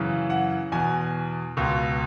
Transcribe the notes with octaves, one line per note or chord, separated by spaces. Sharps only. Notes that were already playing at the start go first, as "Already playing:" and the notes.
Already playing: F#2 C#3 E3
F#5
E2 B2 G#5
C#2 B2